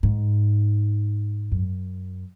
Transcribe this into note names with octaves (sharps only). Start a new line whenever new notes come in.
G#2
F#2